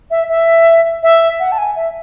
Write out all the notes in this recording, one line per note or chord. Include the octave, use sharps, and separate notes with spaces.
E5
E5
E5
F#5
A5
G#5
E5